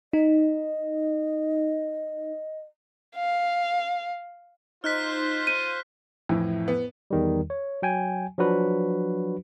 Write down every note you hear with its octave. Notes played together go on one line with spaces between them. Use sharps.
D#4 D#5
F5
D#4 F4 C5 F6 F#6 B6
D#7
F2 A2 E3
B3
E2 D#3 G3
C#5
F#3 G5 G#5
F3 F#3 D4 F#4 B4